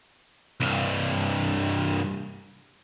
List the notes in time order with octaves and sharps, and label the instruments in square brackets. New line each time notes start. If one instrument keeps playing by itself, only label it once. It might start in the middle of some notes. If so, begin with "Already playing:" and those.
[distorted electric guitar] C2 G2